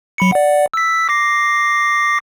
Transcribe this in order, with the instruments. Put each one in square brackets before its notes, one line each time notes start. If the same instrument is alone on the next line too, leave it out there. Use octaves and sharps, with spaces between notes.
[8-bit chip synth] F#3 B5 C#7
D5 F#5
E6 B6
D6 A#6 C7